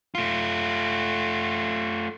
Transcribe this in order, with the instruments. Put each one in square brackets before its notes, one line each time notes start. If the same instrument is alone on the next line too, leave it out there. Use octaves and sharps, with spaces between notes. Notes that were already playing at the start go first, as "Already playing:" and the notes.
[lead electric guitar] A3 F4